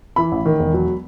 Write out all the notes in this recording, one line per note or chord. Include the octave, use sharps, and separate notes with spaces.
E3 B5
A1
D#3
E1
F#3